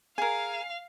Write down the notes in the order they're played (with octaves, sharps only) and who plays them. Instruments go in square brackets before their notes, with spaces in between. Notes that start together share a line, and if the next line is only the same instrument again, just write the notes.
[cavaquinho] G#4 A#4 [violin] F5 [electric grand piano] G#5